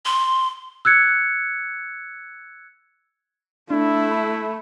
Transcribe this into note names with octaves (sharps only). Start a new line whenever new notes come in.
C6
E6 F#6 G#6 C#7
A3 D4 E4
B5